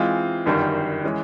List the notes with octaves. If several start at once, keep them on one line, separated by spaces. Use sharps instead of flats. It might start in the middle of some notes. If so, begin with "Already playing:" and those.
Already playing: E3 G#3 C4 F4
G1 F#2 D#3 G3
E3 G#3 C#4